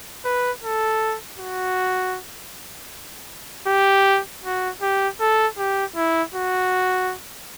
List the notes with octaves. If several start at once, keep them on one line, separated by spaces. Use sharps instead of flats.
B4
A4
F#4
G4
F#4
G4
A4
G4
E4
F#4